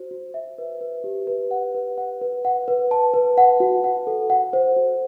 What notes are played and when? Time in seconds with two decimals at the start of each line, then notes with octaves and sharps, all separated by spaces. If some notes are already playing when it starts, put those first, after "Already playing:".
Already playing: F#4 C5
0.11 F#4
0.34 E5
0.58 B4
0.81 B4
1.04 G4
1.27 B4
1.51 F#5
1.75 B4
1.98 F#5
2.21 B4
2.45 F#5
2.68 B4
2.91 A5
3.14 B4
3.38 F#5
3.60 F#4
3.84 F#5
4.07 A4
4.30 F#5
4.53 C5
4.76 F#4